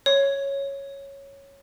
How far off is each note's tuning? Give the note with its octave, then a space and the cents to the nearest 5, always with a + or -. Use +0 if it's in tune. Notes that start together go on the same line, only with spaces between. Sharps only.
C#5 -5